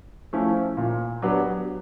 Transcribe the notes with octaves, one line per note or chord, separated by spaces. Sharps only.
F3 A3 C#4 E4
A#2
F#3 B3 D4 G4